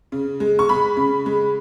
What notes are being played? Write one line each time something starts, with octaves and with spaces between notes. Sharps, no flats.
C#3
G#3
C#6
G#3 B5
C#3
G#3